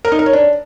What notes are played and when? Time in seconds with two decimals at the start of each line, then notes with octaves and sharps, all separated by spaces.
0.05 A#4
0.12 D#4
0.19 A#4
0.26 C#5
0.33 D4